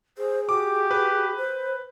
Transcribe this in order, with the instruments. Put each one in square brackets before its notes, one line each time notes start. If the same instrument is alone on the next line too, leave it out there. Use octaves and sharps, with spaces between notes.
[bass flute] G#4 [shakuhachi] C5
[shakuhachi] F#4 [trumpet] G4 [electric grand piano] D6
[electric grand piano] B4
[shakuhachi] C5